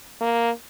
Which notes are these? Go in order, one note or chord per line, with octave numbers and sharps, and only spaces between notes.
A#3